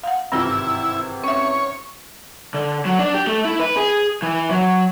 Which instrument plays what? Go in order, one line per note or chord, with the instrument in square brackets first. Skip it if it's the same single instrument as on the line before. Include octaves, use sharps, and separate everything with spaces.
[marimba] F5 F#5
[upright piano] G#1 C3 E3 [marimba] G2 F4 [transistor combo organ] E4
[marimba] C#4 E5 [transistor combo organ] C#5
[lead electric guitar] D3
F#3
D4
G4
A3
E4
B4
G#4
E3
F#3